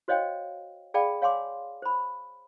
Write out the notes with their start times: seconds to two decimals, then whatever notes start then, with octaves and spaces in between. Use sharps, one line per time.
0.08 F#4 C5 C#5 D#5 F5 G5
0.94 G#4 D5 F5 G5 A5 B5
1.22 C#5 F5 G#5 C6 D6
1.82 C5 B5